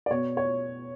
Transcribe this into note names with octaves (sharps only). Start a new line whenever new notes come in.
D5
B2 C#5
C#5